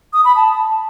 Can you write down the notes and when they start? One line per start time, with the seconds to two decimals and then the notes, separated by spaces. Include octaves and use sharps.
0.13 D#6
0.25 B5
0.36 A5